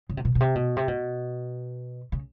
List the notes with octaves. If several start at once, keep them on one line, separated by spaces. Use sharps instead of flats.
C#3
C3
B2
B2
C3
B2
C3
B2
C#3